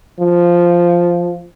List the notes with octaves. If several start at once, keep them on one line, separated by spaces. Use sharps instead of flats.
F3